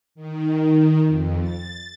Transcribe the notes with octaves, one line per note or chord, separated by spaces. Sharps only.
D#3
F2
A6